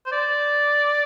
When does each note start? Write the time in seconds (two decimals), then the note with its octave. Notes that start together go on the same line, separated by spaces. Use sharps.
0.06 C5
0.12 D5